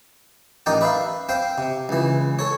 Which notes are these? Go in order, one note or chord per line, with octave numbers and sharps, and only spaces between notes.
A1 D#4 A#4 D5 G5
B4 E5 F5
C4 C5 F5 G5
C3
C#2 E3
A4 C#5